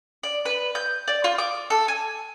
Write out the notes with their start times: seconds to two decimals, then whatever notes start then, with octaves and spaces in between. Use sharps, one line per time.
0.23 D5
0.45 B4
0.75 G6
1.08 D5
1.24 F4
1.38 D6
1.70 A4
1.88 G#5